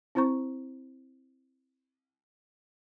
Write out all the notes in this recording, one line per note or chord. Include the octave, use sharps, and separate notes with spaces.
C4 E4 C5 A#5 C#6